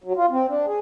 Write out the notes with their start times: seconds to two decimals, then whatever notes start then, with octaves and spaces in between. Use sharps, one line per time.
0.04 F#3
0.16 F4
0.30 C4
0.48 D4
0.66 G#4